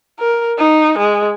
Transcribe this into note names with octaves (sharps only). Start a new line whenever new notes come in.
A#4
D#4
G#3